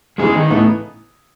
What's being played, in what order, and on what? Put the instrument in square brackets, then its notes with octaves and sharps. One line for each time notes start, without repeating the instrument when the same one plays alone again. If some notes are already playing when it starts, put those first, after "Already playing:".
[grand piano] C#3 E3 B3 D#4 [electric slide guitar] G#3 G#4
[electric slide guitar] D#3 D#4
[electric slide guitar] A2 A3 [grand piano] C#3 E3 B3 D#4